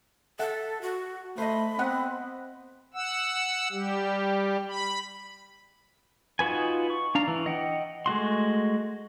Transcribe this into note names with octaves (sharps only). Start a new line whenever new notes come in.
A4 E5 F#5
F#4
A3 C5 D#5 B5
B3 C4 D#5 F#5
F#5 E6
G3 G4
B5
D#4 F4 F#4 B4 G#5
C#6
D4 F5 A#5
E3
D#5 F#5 G5
G#3 A3 F#4 C6